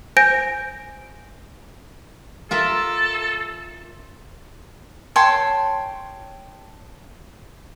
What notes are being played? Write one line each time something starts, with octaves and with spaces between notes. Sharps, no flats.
C5 G#5 G6 A#6 D7
F4 A4 A#4 E5
C#5 G5 A5 C6